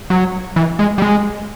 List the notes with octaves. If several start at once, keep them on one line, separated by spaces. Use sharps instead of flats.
F#3
E3
G#3
G3
G#3